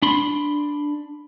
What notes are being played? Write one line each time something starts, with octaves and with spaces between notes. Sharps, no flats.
D4 B5 C6